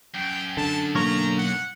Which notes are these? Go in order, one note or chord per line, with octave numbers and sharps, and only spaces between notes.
F#2 G5
D3 A5
B1 A#3 C#5 A#5
F#5